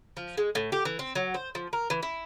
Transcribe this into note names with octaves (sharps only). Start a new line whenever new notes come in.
F3
G#3
A2
G4
E3
C4
F#3
C5
F3
A#4
E3
E4